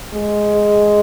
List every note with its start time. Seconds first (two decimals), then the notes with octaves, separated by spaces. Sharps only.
0.14 G#3